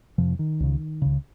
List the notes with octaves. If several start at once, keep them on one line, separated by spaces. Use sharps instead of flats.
F2 C3 F3
D#3
C#2 C#3
C#2 C#3